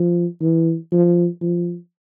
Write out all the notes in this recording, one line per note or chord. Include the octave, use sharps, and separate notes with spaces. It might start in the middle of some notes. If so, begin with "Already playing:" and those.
Already playing: F3
E3
F3
F3